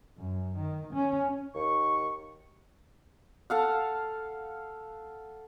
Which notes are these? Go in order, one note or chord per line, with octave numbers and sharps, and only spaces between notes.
F#2
D#3
C#4
D#2 C#6
A4 F5 F#5